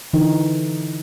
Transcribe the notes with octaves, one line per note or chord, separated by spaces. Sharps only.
D3 E3 D#4